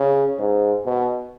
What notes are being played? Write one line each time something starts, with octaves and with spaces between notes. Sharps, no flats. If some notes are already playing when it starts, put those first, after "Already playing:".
Already playing: C#3
G#2
B2